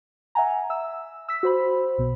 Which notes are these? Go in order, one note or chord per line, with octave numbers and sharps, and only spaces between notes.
E5 F#5 G#5 A#5
E5 E6
E6 B6
F#4 C5 B5
B1 B2